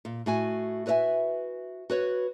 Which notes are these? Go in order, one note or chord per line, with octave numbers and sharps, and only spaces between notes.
A#2
A2 F#4 G#5
F#4 B4 C#5 D#5 E5 G#5
F#4 B4 C#5